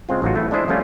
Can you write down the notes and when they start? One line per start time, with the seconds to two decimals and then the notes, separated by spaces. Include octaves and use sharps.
0.09 C#3 G#3 C4 F4
0.22 A1 F#3 D#4 F4 F#4
0.36 A3 E4
0.51 G#3 D4 E4 C5 D#5 E5
0.68 F3 G3 A3 C#4 F4